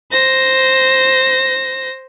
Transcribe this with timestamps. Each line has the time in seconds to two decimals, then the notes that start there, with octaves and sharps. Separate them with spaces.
0.11 C5 A#6